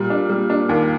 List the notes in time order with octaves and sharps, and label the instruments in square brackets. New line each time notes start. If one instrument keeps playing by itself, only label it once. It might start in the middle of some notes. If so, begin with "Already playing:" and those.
Already playing: [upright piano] A#2 G3
D4
G3
D4
D#2